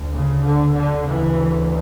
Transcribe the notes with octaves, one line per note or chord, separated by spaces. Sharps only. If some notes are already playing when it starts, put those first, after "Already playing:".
Already playing: D2
C#3
D3
D3
D2 C#3 E3